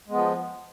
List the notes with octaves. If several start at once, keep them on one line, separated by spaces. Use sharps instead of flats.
F3 G#3 B3